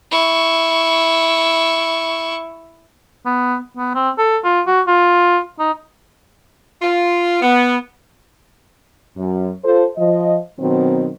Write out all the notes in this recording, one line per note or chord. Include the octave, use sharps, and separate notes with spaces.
E4 C#6
B3
B3
C4
A4
F4
F#4
F4
D#4
F4
B3
F#2
F4 A4 C5
F3 D#5
B2 D#3 F#3 C4